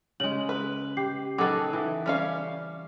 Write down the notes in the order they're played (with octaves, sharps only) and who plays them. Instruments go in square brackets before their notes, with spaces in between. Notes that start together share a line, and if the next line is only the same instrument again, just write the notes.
[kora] C#3 G#3 [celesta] F#7
[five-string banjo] B4
[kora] G4 [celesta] C7
[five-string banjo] D#3 F#3 [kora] G#4 A4 B4 [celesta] D6
[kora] E3
[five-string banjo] G3 C#4 F5